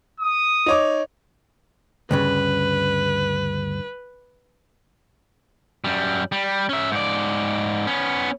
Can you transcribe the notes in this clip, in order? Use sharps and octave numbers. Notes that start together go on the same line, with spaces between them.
D#6
D#4 C#5 D6
D2 G2 C#3 B4
F#2 G3
G3
C#4 E5
G#2 D5
B3 C#4